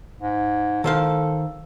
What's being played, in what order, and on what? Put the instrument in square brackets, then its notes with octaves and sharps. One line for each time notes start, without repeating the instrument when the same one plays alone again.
[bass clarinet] G#2
[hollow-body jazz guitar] D#3 C5 F5 [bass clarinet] A4